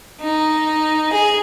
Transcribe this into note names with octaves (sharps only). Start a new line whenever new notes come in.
D#4
G#4